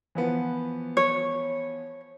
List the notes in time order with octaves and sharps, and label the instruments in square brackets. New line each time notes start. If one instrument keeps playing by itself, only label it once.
[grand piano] E3 F3 B3
[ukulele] C#5